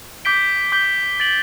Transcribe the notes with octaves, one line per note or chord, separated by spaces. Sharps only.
D6 G6 B6 D7 G7
D6 G6 B6 D7 G7
A6 D7 F#7